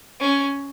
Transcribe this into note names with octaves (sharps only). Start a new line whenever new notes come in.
C#4